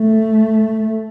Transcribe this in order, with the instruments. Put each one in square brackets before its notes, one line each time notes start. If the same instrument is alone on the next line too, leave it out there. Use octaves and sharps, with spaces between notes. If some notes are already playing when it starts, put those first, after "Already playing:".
Already playing: [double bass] A3